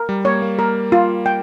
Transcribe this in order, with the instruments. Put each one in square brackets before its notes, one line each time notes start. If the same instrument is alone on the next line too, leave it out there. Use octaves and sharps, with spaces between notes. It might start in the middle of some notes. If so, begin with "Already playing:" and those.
Already playing: [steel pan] A#4
[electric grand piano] G3
[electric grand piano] A#3 [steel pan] C#5
[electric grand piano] A#3
[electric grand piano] A#3 [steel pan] A#4
[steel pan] F4
G5